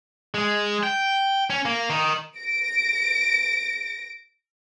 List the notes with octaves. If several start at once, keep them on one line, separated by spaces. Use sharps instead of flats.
G#3
G5
C#4
A#3
D#3 D#4
A#6 D7